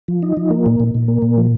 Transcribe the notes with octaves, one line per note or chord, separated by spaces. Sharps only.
F3
D#4
F3
A#3
A#2
A#2
A#2
A#3
A#2
F3